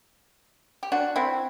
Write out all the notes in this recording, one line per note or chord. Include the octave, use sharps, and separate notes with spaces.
G4
D4 F#4
C4 E4